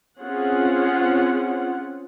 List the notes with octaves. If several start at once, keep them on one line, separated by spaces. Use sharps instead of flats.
C4 C#4 F4 G#4 F#5